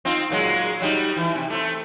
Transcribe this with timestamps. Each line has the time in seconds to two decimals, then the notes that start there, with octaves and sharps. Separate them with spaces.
0.05 C4 D#4 F4
0.31 A#2 F#3 G#3
0.80 F#3 G3 D#4
1.16 E3
1.35 C3
1.50 A3 C4